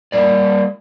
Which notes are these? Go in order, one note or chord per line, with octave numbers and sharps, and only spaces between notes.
G3 A#3 D5